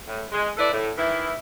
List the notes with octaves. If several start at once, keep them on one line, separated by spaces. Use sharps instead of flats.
A2
G#3
E4 A4 B4 D5
A2
D#3 E3 E4